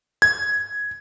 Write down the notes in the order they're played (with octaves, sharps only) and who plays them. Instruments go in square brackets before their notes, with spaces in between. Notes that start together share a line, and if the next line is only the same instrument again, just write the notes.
[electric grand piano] G#6